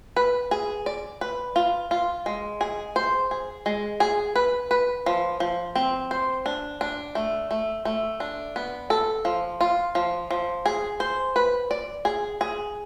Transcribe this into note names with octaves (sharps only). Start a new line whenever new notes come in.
B4
G#4
D5
B4
F4
F4
G#3
G#4
C5
G#4
G#3
G#4
B4
B4
F3
F3
C4
C5
D4
D4
A3
A3
A3
D4
B3
A4
F3
F4
F3
F3
G#4
C5
B4
D5
G#4
G#4